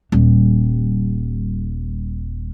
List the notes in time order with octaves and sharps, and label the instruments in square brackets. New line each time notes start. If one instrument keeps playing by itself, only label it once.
[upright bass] D#1 G3